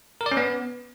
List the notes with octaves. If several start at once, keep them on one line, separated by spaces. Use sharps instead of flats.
A#4
D5
C#4
B3